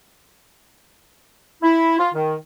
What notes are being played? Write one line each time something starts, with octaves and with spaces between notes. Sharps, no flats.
E4
F4
D#3